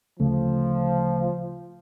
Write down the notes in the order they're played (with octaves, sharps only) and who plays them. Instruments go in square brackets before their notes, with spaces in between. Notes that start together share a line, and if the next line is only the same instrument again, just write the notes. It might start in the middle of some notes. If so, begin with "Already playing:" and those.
[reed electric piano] D2 C#3 A3 [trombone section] F3